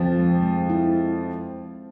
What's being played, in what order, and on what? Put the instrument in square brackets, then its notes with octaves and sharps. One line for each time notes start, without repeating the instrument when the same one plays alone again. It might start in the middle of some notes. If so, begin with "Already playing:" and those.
Already playing: [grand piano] F2 F3 [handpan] C4
[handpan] G#3
G#3
E4